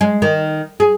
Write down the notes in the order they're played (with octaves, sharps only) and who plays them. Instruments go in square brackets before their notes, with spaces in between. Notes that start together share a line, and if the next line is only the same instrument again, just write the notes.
[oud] G#3
D#3
G#4